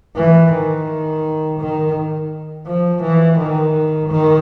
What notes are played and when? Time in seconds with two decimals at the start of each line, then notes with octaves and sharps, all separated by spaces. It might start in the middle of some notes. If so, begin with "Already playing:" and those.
0.16 E3
0.52 D#3
1.59 D#3
2.67 F3
3.02 E3
3.38 D#3
4.09 D#3